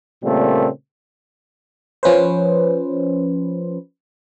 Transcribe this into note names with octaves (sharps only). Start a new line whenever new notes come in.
A#2 C#3 G3 A3 A#3 C4
F3 C#4 B4 C5